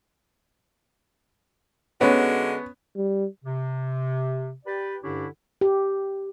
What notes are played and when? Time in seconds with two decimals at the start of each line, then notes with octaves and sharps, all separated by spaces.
2.01 D3 G#3 B3 C#4 F#4
2.96 G3
3.44 C3
4.65 G4 B4 D5
5.03 G2 D3 C#4 D4 E4 G4
5.61 G4